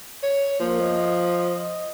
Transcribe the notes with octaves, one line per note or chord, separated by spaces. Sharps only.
C#5
F3 A#3
D#5